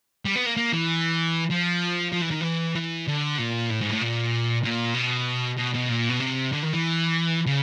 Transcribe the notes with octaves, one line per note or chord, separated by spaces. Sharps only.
G3
B3
A#3
A#3
E3
F3
F3
E3
D#3
E3
E3
D3
A#2
A2
G#2
A2
A#2
A#2
B2
B2
B2
A#2
B2
C3
D3
D#3
E3
C#3